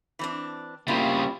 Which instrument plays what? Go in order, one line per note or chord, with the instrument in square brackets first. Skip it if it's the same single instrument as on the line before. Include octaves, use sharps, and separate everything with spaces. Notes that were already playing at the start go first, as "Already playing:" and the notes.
[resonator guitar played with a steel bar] E3 C4 D4
[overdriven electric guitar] C#3 G3 [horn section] A#3 C4 [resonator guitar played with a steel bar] E4 F4